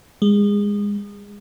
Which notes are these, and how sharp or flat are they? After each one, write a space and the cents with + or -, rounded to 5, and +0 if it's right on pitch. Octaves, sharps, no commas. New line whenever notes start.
G#3 -25